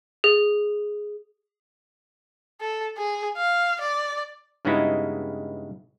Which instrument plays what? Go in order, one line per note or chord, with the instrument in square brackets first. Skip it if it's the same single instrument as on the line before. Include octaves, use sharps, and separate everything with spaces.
[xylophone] G#4
[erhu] A4
G#4
F5
D5
[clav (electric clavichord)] G2 C#3 G#3 B3 D#4 E4